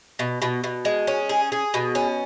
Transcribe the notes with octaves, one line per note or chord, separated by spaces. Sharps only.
B2
B2
B2
G#3
C#4
G#4
G#4
B2
C#4